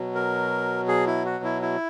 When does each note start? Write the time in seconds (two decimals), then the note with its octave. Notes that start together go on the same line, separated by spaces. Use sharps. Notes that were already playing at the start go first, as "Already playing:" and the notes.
Already playing: B2 F#3
0.15 A#4
0.88 G#4
1.07 E4
1.25 F#4
1.44 E4
1.62 E4